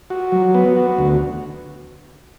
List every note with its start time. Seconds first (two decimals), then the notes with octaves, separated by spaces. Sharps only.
0.10 F#4
0.32 F#3
0.55 B3
0.76 F#4
0.98 D2